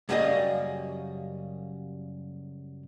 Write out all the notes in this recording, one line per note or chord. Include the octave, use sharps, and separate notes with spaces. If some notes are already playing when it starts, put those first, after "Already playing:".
F#2 C#3 G3 A#3 G#4 D#5